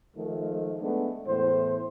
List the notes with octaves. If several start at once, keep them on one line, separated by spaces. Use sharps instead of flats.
D#3 F3 G#3 A3
G#3 A3 B3 D4
E2 A2 C5